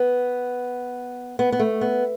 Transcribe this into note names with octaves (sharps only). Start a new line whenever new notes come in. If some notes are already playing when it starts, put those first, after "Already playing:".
Already playing: B3
B3
B3
A3
B3